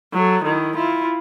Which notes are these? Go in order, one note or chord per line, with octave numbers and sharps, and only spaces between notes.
F#3 A4
D#3 E4
E4 F4